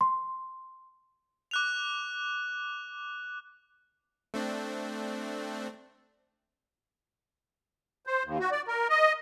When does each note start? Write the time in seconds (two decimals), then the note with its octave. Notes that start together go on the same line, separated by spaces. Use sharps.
0.01 C6
1.51 D6 F#6 F7
4.34 A3 C4 D4
8.07 C5
8.24 D#2
8.40 F#4
8.51 D5
8.68 A#4
8.90 D#5